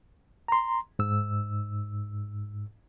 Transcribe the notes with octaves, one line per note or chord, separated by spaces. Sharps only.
A#5 C6
G#2 E6